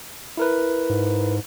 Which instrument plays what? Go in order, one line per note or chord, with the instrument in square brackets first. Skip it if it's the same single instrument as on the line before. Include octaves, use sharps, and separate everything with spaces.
[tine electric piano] E4 A#4 B4
[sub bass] G#2